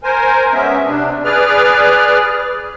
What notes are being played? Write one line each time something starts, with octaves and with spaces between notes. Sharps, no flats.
A#4 C5 G#5
G#3 B3 C#4 E5
C3 D4
G#4 B4 D5 F6